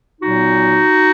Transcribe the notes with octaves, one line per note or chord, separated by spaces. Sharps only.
A#2 F#3 B3 D#4 F#4